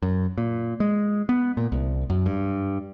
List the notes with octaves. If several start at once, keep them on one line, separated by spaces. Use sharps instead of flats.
F#2
A#2
G#3
B3
A#2
C2
F#2
G2